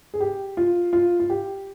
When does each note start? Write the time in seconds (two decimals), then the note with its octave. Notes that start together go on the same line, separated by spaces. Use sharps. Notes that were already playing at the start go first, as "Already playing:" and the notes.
0.14 G#4
0.20 G4
0.57 F4
0.93 F4
1.20 F4
1.30 G4